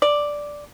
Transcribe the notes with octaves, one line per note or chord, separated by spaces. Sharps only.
D5